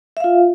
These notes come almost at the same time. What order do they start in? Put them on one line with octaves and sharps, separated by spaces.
E5 F5 F4